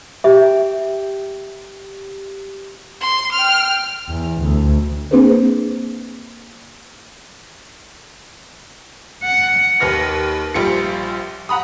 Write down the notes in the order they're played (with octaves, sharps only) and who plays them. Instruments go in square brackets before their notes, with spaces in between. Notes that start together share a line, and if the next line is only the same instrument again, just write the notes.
[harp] G4 [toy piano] E5
[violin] C6
G5 F6
[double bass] E2
D2
[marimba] A#3 C4 D4 G#4 B4 C5
[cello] F#5
[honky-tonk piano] D#2 B4 F6 A#6
A#1 F3 G3 F4 G4 C#7
F#5 A#5 B5 D#6